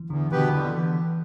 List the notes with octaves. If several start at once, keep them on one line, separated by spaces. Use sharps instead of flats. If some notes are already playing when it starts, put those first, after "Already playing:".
Already playing: E3
E2 D3
B2 D3 B3 G4 B4
D3 E3